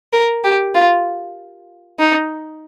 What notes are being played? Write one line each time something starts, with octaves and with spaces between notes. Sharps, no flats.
A#4
G4
F4
D#4